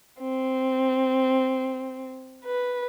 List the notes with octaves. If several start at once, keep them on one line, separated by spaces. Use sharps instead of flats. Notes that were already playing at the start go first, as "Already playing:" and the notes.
C4
B4